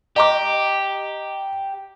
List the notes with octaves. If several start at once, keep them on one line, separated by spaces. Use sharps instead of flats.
G4 D#5 A#5 D6